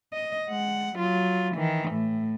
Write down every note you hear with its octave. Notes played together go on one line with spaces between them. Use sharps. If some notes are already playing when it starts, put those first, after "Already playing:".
D#5
G#3 F#5
F#3 F4
D#3 E3
A2